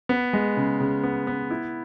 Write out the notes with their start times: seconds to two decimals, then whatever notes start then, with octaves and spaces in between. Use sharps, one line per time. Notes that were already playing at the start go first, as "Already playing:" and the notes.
0.09 B3
0.33 G#3
0.57 C#3
0.80 C#3
1.03 B3
1.27 B3
1.51 E4